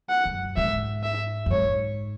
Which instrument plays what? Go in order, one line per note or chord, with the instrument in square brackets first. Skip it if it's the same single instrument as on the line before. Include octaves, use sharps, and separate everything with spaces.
[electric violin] F#5
[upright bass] F#2
[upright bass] G#2 [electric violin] E5
[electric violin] E5
[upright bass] F#2
[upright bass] G#2 [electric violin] C#5